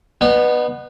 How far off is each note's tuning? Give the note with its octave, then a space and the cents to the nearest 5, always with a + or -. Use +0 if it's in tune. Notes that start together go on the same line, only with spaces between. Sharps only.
B3 +0 D#4 -35